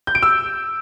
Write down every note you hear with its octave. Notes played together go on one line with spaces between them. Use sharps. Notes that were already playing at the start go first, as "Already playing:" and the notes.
G6
D7
E6